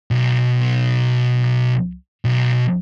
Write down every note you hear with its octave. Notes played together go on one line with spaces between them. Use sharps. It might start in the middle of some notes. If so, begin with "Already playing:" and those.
B1
B1